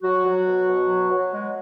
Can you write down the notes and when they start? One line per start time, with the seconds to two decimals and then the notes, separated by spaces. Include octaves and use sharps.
0.02 F#3 F#4
0.24 F#3
0.45 B2
0.67 B2
0.89 F#3
1.10 F#3
1.32 G#3